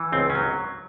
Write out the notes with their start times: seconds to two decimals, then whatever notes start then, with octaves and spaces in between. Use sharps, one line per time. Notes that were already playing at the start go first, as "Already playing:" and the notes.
Already playing: E3
0.12 C#2 C4
0.30 C#4
0.35 F#3